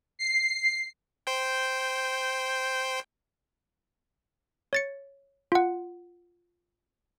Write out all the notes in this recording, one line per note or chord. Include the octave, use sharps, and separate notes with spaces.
C7
C5 G5
C#5 A6 C#7
F4 F#5